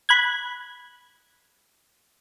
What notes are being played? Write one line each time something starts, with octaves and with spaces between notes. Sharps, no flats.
B5 F#6 G#6